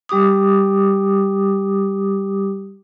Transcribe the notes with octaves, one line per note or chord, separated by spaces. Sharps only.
G3 G4 D6 D#6